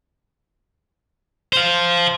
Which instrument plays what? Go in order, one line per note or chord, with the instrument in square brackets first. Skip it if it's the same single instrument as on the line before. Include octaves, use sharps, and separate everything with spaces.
[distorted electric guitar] C5 F5